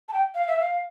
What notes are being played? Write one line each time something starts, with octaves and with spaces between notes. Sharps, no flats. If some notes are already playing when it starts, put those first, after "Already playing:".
A5
G5
F5
E5
F5